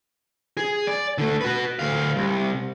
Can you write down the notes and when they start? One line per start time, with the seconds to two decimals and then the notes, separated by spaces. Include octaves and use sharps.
0.57 G#4
0.87 D5
1.18 D3 A3
1.41 F#4 B4
1.79 D2 F5
2.16 C2